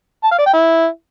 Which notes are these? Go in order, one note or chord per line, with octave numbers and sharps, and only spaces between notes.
A5
F5
D5
G5
E4